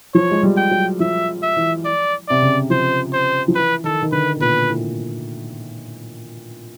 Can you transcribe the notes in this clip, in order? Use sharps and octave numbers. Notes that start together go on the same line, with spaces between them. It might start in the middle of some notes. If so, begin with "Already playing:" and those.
F3 C#5
G#3
G3
G5
F#3
F3 E5
E5
E3
D5
C3 D5
C#3
F3 C5
C5
F3
E3 B4
D#3 A4
D#3
D3 B4
B2
A#2 B4
A2